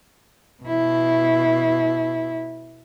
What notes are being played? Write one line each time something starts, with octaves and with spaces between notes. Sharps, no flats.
B2 E4